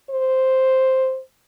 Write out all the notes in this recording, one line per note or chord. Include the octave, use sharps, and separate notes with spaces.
C5